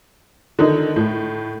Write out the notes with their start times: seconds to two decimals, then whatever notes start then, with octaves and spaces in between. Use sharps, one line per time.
0.59 D3 D#3 D#4
0.96 A2